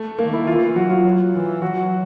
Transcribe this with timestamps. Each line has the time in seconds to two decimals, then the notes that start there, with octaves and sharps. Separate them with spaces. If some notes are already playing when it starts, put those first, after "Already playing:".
Already playing: A3
0.19 D#3 A#3
0.33 E4
0.47 E3 F4
0.75 F#3 F#4
0.90 F4
1.34 E3
1.62 F#3 F#4